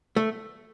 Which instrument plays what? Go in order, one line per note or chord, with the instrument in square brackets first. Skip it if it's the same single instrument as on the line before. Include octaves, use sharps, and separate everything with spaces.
[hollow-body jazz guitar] A3